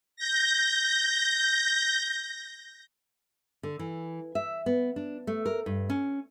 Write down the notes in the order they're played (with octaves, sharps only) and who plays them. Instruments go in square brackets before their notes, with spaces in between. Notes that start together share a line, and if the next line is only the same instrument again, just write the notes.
[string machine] G6 A#6
[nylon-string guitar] D3
E3
E5
B3
D4
A3
A#4
G2
C#4